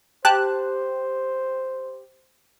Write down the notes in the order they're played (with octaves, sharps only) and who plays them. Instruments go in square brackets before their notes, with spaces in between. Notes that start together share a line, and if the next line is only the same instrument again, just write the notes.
[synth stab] G4 [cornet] C5 [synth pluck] A5 F#6